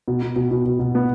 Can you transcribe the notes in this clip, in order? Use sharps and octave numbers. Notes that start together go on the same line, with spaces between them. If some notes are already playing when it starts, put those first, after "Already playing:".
B2
B2
B2
B2
B2
B2
B3